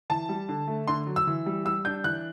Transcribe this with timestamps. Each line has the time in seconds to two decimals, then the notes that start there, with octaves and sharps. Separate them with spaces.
0.10 E3 A5
0.29 G3
0.49 D3
0.68 A3
0.88 D3 C6
1.07 F#3
1.16 E6
1.27 E3
1.46 G3
1.65 G3 E6
1.85 D4 G6
2.04 E3 F#6